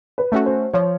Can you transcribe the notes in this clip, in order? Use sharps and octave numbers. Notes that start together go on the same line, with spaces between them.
B4
A3 C#4 F#4
C5
F3 C#5